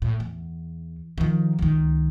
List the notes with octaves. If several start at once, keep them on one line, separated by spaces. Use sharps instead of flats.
A2
E2
D#3 F3
C#2 D#3